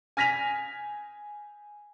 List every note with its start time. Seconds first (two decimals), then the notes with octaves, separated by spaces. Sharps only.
0.17 G#5 F6 A#6 B6 D#7 F7